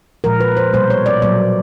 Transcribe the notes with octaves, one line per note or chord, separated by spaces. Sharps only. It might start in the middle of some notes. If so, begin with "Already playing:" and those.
A#2 F3 G#3 A#4
B4
C5
B2 G3 A#3 C5
C#5
D5
A#2 F#3 A#3 D5